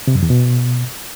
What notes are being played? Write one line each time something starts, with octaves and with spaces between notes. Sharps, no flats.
C3
F#2
E2
B2